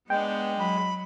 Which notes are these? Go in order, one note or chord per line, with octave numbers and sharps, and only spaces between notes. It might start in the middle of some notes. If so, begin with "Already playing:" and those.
G#3 B3 D4 G5
F#3 B5